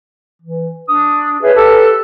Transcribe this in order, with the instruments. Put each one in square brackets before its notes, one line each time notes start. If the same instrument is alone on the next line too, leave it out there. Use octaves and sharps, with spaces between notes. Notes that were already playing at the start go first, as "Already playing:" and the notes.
[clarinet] E3
[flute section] D4 [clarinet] D#6
[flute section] G#4 C#5 E5 [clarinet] B4
[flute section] G4 A4 A5